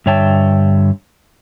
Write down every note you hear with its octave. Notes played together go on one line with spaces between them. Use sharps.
G2 D3 C#5 E5 G5 A5